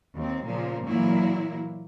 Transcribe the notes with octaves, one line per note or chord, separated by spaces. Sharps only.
D#2 C4
A#2 C#3 F3 A#3
A#2 E3 F#3 A#3 E4